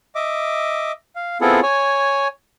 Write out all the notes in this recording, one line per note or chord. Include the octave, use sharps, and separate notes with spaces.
D#5 E5 D6
F5
B3 C4 E4 F4 G#4 A4
C#5 G#5